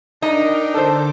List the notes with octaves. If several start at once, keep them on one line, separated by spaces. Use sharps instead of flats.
D4 D#4 A#4 G5
D3 A4 C5 D6